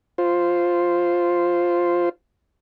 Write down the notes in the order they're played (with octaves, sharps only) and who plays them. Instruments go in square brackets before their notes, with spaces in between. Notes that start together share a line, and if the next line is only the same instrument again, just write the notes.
[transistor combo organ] F4 C5